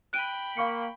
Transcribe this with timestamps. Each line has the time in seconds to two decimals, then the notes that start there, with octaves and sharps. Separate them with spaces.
0.13 G5 B5 F#6 D7 D#7
0.57 A#3 F5 C#6 C#7